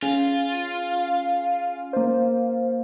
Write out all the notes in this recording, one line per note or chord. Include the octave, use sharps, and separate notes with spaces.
C#4 F4 G#4 G#5
A#3 C5